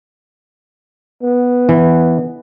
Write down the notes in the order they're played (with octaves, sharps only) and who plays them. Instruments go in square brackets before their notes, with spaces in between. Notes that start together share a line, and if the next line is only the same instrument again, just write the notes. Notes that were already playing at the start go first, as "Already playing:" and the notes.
[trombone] B3
[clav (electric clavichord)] E3